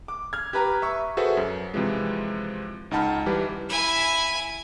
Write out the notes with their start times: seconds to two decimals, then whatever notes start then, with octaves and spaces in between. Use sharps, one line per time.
0.08 D6
0.33 F6 G#6
0.53 G4 B4 A#5
0.82 E5 C#6
1.17 F#4 G#4 A4 B4 C5 E5
1.37 F#2
1.74 C3 E3 F3 G#3
2.91 C#2 D#4 F#5 A5 B5 F6
3.26 E3 G3 G4 B4
3.69 E4 G#5